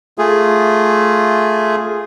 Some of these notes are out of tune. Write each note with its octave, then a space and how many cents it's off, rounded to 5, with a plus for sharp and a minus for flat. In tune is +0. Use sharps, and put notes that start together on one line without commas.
A3 +0 F4 +0 G#4 +0